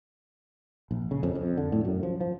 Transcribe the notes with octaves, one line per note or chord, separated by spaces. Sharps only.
A#1
C#3
F2
F2
D3
A2
F#2
F3
F3